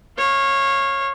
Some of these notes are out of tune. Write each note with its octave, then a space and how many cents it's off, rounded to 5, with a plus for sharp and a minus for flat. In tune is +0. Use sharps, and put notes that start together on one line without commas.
C#5 -20 F5 +0